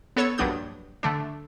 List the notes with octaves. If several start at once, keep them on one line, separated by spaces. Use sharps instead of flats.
B3 A4 C#5 E6 G#6
A#1 G2 F#3 D4 D#6 G6
D3 A3 D4